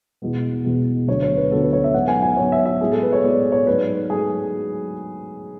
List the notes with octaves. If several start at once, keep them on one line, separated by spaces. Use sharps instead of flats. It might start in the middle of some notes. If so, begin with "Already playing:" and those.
E2 B2 G#3 B3
E2 B2 G#3 B3
D2 D3 F#3 B3 C#5
C#5
B4
D2 D3 F#3 B3 A4
B4
C#5
E5
G#2 F#3 B3 F#5
G#5
G#5
G#2 F#3 B3 C#5
E5
E5
A2 G#3 B3 G#4
A4
B4
C#5
A2 G#3 B3 D5
C#5
G#2 F#3 A3 B4
G#2 F#3 A3 G#4